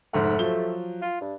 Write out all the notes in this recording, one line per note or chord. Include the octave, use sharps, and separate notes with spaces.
F1 G#2 A3 F#5
F3 F#3 G7
F4
G2